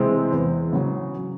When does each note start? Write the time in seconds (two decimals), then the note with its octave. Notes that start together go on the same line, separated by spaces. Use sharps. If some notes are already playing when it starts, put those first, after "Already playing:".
Already playing: C3 E3 G#3 C4
0.32 E2
0.73 C#3 F#3